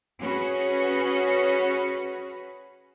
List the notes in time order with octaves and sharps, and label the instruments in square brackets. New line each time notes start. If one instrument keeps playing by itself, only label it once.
[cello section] C#4 F#4 G#4 B4